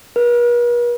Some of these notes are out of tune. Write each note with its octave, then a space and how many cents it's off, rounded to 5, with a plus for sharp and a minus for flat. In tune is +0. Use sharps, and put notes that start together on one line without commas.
B4 -45